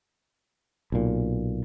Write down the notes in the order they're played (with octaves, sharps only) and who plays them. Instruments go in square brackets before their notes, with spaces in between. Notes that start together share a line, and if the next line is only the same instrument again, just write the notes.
[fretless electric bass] B1 A#2